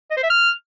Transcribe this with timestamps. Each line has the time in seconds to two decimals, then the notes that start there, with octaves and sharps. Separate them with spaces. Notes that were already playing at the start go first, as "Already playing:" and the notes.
0.11 D#5
0.17 C5
0.23 E5
0.30 F6